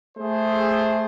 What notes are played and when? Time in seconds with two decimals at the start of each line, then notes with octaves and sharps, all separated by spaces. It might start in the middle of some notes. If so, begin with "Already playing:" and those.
0.18 A3 G#4 C5